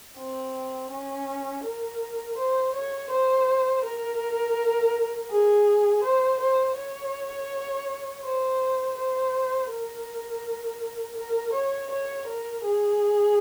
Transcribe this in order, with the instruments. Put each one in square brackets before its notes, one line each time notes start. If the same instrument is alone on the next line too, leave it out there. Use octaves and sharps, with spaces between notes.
[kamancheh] C4
C#4
A#4
C5
C#5
C5
A#4
G#4
C5
C5
C#5
C5
C5
A#4
A#4
C#5
C#5
A#4
G#4